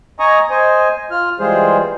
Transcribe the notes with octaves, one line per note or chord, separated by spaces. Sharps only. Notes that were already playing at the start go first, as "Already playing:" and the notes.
D#5 G#5 A#5 C#6 D#6
C5 D#5 G#5
F4 F6
E3 G3 G#3 F4 G#4 C5